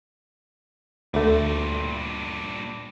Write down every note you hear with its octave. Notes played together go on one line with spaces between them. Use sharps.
D2 G2 A#2 A3